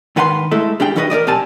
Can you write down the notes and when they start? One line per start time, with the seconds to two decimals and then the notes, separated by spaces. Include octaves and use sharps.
0.16 G#2 D#3 B4 F#5 A#5 C6
0.51 G#3 A3 E4 A4
0.80 G3 D4 G#4 G5
0.96 E3 D#4 F#4 B4 D5 D#5
1.10 A#4 C5 D5 D#5
1.27 B1 C4 G4 D5 G#5 A5